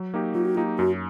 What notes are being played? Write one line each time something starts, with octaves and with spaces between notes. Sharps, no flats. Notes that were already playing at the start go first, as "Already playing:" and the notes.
Already playing: F#3
A#3 D#4 G4
F#3 F4
F#4
A#3 D#4 F4 G4
F#2 F#4